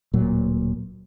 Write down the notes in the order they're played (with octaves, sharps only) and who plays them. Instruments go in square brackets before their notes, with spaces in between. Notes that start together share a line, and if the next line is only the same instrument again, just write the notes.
[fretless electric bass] D1 A#2 F#3